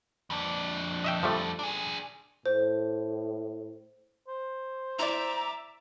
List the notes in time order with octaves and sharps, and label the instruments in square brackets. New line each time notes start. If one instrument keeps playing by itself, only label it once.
[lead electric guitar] F2 D4
[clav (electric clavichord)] D#5 E5 G5
F3 G3 A3
[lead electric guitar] D4 G#4
[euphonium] A2 [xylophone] C5
[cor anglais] C5
[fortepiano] E4 D5 [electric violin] E5 D6 [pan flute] A#5